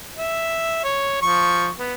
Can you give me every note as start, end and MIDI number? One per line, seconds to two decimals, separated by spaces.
0.17 0.82 76
0.84 1.19 73
1.22 1.69 53
1.22 1.69 85
1.79 1.94 59